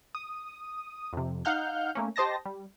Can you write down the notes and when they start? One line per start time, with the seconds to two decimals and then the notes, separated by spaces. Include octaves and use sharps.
0.15 D#6
1.13 F2 C3
1.45 D#4 F5 F#5 F6 G6
1.95 A3 A#3 C#4
2.16 G4 C5 D#5 A5 A#6
2.45 G3